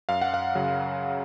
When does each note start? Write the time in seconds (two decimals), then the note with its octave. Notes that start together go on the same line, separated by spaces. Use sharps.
0.09 F#2 F5
0.22 F#5
0.34 F5
0.55 C#3 F#3